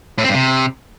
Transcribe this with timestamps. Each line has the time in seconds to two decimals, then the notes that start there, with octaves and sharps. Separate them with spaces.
0.18 A2
0.24 C4
0.29 G2
0.35 C3